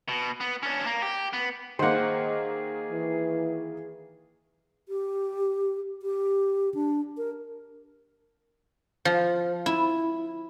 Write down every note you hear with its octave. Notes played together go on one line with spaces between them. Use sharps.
B2
B3
C#4 D4
A#3
G4
B3
D#3 A#3 G#4 C5 F#5
E3
G4
G4
D4
A#4
F3
E4